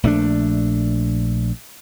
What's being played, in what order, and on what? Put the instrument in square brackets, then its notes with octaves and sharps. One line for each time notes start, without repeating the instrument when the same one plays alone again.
[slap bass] A#1 A3 C#4 D4